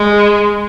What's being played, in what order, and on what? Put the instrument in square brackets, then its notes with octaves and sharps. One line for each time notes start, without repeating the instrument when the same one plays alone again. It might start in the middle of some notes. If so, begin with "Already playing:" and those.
Already playing: [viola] G#3